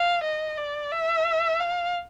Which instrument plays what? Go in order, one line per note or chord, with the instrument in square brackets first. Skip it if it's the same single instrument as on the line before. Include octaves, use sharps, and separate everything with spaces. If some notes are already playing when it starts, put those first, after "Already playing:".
Already playing: [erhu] F5
D#5
D5
E5
F5